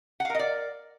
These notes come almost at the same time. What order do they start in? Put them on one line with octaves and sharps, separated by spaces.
F#5 F5 A#4 D#5 D5